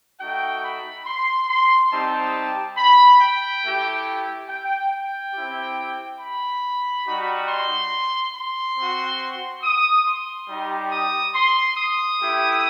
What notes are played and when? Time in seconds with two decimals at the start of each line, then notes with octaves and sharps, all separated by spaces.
0.20 A3 D#4 F#4 G5
0.63 B5
1.06 C6
1.49 C6
1.91 G3 C4 D#4 G4 A5
2.77 B5
3.20 G5
3.63 A3 E4 G4
4.49 G5
4.91 G5
5.34 C4 E4 G4
6.20 B5
7.06 G3 D#4 F#4
7.48 C6
8.35 C6
8.77 C4 F#4
9.63 D#6
10.06 C6
10.48 G3 D#4 G4
10.91 D#6
11.35 C6
11.77 D#6
12.20 A3 E4 G4